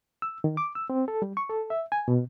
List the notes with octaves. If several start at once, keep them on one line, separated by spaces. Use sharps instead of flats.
E6
D#3
D6
E6
C4
A4
G3
C#6
A4
E5
G#5
B2